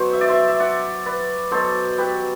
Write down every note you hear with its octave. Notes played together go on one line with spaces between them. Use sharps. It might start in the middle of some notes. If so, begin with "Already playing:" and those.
Already playing: B2 F#3 C5
E5
D5
C5 E5
E5
D5 F#5
B4 D5
B2 F#3 A4 C5
G4 B4